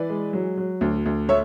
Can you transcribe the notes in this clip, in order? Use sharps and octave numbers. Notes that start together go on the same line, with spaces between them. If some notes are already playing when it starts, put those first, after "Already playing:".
Already playing: E3 B4 D5
G#3
F#3
F#3
D2
D2
A3 C#5 E5